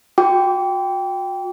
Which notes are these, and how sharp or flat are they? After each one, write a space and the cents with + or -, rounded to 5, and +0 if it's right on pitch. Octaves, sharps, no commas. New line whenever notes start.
F#4 -40 G5 +0 D6 -35